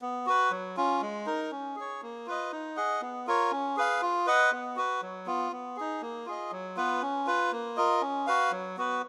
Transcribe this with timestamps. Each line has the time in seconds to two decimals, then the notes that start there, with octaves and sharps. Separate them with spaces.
0.02 B3
0.26 F#4 B4
0.51 F#3
0.77 C#4 F4
1.01 G#3
1.26 D#4 A#4
1.51 C#4
1.76 G#4 C#5
2.02 A#3
2.26 F4 B4 D#5
2.52 D#4
2.77 G#4 D#5 F#5
3.01 B3
3.27 F4 A#4 C#5
3.51 C#4
3.77 G#4 B4 F5
4.02 F4
4.27 B4 D#5 F#5
4.52 B3
4.76 F#4 B4
5.02 F#3
5.26 B3 F4
5.52 B3
5.76 D#4 G#4
6.02 A#3
6.26 F4 G#4 D#5
6.52 F#3
6.76 B3 F4 B4
7.02 C#4
7.26 F4 B4
7.52 A#3
7.77 F4 A#4 D#5
8.01 C#4
8.27 F#4 B4 F5
8.51 F#3
8.77 B3 F#4 B4